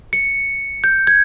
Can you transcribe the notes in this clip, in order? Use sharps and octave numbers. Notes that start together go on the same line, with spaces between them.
C#7
G6
G#6